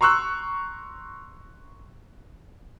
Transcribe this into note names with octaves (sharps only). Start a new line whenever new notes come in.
A#5 C6 C#6 E6 F#6